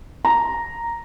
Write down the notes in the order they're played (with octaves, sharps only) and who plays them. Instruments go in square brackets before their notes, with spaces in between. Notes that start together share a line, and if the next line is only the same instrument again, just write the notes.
[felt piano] A#5